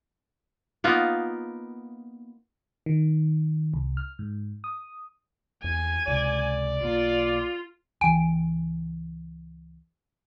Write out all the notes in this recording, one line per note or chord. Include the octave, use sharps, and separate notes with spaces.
A#3 B3 D#4 F4
D#3
C2
F6
G#2
D#6
E2 G#5
C#2 C3 G#3 D5
B1 A#3 F4
C#2 E3 G5 G#5 D7